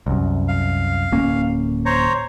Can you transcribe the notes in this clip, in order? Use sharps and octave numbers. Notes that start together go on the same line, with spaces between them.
C2 F#2
F5
D1 A#3 C#4
C5 C#5 A#5